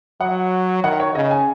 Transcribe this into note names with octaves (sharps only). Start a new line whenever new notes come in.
F#3 F#5
D#3 F#5
C#5
C#3 D#5
G#5